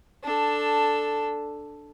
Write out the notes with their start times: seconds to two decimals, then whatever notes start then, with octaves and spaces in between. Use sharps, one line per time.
0.24 D4 A4